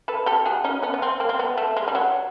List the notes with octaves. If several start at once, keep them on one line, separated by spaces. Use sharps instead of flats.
A4 B4
G4 A4
F#4 G#4
C#4 D#4
B3 C#4
B3
C4
A#3
C4
B3
A3
G#3
G3
F#3